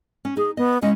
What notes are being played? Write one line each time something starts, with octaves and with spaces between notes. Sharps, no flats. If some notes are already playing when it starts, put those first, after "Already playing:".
C#4
D#4 G#4
B3 D#5
G#3 C#4 E4 D#5